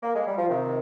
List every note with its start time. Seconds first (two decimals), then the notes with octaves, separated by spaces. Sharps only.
0.03 A#3
0.15 G#3
0.27 G3
0.38 F3
0.49 C3 D#3